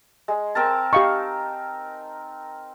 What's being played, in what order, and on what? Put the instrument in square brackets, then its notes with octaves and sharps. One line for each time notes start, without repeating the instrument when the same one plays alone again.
[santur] G#3
C4 A#4 A5
[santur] D#4 [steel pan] G4 F5 C#6